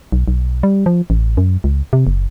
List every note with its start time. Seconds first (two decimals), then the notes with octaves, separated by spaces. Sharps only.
0.12 B1
0.28 B1
0.63 G3
0.86 F3
1.10 A1
1.37 F#2
1.64 C#2
1.93 C3
2.07 F#1